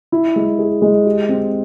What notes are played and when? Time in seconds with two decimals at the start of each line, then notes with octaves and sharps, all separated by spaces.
0.12 E4
0.36 G#3
0.59 G#4
0.82 G#3
1.06 G4
1.29 C4